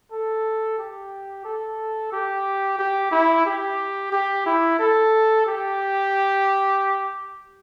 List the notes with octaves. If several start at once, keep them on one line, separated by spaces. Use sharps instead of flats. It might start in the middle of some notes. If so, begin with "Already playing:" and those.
A4
G4
A4
G4
G4
E4
G4
G4
E4
A4
G4